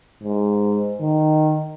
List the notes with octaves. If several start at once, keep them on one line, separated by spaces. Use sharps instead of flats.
G#2
D#3